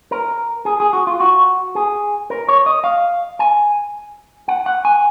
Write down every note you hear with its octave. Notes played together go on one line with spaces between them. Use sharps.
A#4
G#4
G#4
F#4
F4
F#4
G#4
A#4
C#5
D#5
F5
G#5
F#5
F#5
G#5